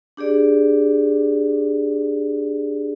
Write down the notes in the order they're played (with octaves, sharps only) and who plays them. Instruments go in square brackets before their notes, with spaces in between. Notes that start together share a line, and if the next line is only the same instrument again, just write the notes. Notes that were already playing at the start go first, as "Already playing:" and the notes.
[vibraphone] D4 G4 G#4 D5